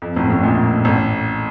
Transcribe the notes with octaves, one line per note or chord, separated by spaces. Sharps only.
F2
A1 A2
A1 A2
A#1 A#2
A1 A2